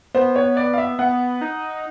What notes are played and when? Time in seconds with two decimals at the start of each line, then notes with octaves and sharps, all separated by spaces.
0.14 B3 C5
0.36 C#5
0.57 D5
0.73 F5
0.78 E5
0.99 B3 F#5
1.41 D#4